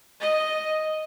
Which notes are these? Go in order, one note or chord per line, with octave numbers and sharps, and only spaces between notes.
D#5